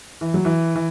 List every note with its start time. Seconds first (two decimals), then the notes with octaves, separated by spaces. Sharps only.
0.21 E3
0.34 F#3
0.45 E3
0.76 E3